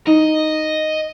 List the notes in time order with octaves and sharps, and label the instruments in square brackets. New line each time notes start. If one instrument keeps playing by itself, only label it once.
[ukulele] D#4 [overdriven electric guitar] D#5